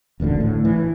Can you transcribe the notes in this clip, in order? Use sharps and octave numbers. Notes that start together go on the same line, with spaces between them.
D#1 A1 D2 D3
A2
E3